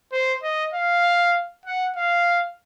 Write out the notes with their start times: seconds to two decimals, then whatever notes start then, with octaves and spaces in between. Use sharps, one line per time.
0.12 C5
0.43 D#5
0.74 F5
1.66 F#5
1.96 F5